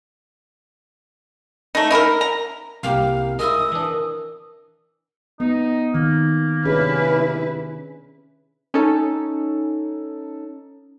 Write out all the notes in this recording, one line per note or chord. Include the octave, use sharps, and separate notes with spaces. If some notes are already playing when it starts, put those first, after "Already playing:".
A3 D#4
D#4 E4 A4 A#4
A#5
C2 A#3 G4 F5
G#3 E4 A#4 D#6 E6
E3 D4
B3 D#4
D#3 A#3
C3 C#4 D4 E4 G#4 B4
C#4 D#4 A4